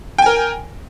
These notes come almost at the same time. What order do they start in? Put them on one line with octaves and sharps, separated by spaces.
G5 G#5 A#4